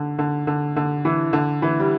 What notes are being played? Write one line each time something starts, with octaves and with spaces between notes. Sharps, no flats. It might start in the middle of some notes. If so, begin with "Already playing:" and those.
Already playing: D3
D3
D3
D3
E3
D3
E3
G3